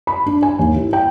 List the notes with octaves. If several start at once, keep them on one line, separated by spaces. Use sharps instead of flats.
B5
D4
G#5
D#2
E4
G5